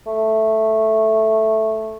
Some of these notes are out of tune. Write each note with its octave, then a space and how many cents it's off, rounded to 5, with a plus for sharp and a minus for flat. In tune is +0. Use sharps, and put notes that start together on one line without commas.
A3 +0